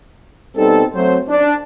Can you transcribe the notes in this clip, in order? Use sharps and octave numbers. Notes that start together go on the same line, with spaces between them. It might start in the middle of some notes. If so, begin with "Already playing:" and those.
B2 G3 B3 C4 D#4 A4
F#3 A3 C4 C5
D4